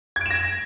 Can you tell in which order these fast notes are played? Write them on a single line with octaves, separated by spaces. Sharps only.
G#6 D7 E7 A#6